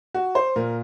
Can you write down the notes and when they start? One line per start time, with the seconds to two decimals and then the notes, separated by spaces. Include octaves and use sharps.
0.14 F#4
0.35 C5
0.56 A#2 A#4